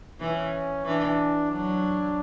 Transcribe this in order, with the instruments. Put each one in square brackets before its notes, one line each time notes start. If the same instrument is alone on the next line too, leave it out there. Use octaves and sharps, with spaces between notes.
[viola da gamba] E3 [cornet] C#4
[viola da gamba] E3 [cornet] D4
[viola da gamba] F#3 [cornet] D4